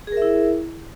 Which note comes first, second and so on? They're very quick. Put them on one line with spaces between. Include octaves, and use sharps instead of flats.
G#4 A#4 E5 E4